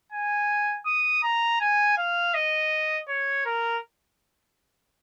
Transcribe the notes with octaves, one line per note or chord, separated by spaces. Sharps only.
G#5
D#6
A#5
G#5
F5
D#5
C#5
A#4